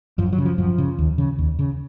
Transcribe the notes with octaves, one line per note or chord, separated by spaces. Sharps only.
F#2 F3
F#3
C#3
F3
F#2 F3
C#3
D#2
C#3
D#2
C#3